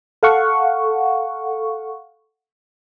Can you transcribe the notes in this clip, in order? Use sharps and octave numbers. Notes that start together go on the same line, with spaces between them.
A4 F5 F#5 C#6